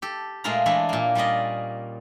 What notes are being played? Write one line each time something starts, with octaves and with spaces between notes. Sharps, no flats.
G4 A4
A#2 G#3 A3 F4 A#4 A#5
E3 G#3 A3 D4 E4
A#2 A#3
G3 C#4 F4 D5 D#5